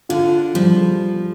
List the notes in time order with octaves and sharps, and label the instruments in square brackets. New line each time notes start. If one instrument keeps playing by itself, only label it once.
[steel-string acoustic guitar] D3 [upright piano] F4
[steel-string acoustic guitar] F3 [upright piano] G3